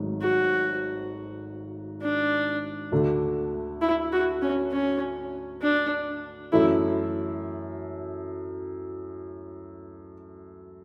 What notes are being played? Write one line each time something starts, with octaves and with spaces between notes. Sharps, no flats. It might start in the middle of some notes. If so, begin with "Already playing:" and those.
Already playing: G#1 G#2 F#3 A3
F#4
D4
D2 D3 A3
E4
F#4
C#4
C#4
D4
F#2 E3 A3 E4